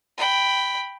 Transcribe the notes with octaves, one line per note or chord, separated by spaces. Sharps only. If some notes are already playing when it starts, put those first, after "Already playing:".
G5 B5